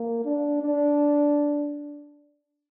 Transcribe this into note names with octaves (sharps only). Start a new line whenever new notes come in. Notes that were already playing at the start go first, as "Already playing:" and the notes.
Already playing: A#3
D4
D4